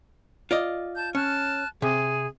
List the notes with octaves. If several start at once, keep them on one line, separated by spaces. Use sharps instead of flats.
F4 D5 D#5
A5 G6
C#4 A5 F6 F#6
C3 G#4